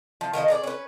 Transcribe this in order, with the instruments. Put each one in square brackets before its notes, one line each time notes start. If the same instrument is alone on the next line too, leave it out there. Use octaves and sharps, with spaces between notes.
[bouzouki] F3
D#3 F3 C5 D#5
G#4 A#4 D5
C#4 B4